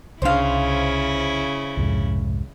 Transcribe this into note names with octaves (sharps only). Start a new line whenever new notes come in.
C2 C#3 D4 E4 C5 F5
C2 F2 G#2